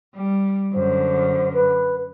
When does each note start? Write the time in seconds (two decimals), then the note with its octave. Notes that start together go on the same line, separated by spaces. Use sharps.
0.15 G3
0.74 F#2 D3 C5
1.54 B4